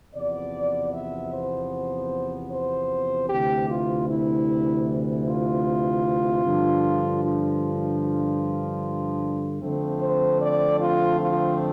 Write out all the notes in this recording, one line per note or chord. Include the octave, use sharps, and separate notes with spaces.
E2 C3 F3 B3 D5
E5
C5
C5
D2 C3 E3 G4
F4
E4
F4
G2 D3 F3
F4
F4
F2 D3 F3 A3 C4
C5
D5
F4
F4